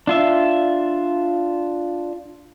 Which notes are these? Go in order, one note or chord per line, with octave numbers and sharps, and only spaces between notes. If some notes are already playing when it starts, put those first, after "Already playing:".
D4 F4 E5